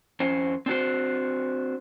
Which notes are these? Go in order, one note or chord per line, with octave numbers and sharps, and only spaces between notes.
F2 C#4 C5
C4 D4 F#4 C5